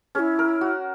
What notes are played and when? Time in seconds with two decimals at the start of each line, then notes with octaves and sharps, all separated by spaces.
0.15 C#4 G#4
0.19 E4
0.39 A#4
0.61 F#4